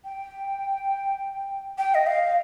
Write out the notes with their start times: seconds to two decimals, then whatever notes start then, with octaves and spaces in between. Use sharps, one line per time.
0.04 G5
1.78 G5
1.95 D#5
2.07 F5